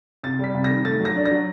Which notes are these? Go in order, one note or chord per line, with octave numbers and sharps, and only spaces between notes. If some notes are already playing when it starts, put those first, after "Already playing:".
C3 A6
G3 B6
C3
A#6
D#3
A3 A6
F#3
A#6
D4
A#6
F#3